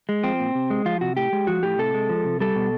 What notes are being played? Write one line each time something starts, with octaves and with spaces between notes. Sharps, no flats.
G#3
F3 C4
A#2
C3
G#3
F3 F4
C3 F#4
A2 G4
G#3
F3 F#4
A2 G4
C3 A4
G#3
F3
C3
G3 A4
B2